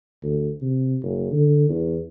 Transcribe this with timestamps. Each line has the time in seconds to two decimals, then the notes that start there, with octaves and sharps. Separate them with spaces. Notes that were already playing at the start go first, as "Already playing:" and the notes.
0.23 D2
0.62 C3
1.03 F#1
1.32 D3
1.69 E2